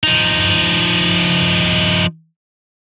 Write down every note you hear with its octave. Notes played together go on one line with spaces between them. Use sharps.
F3 D#4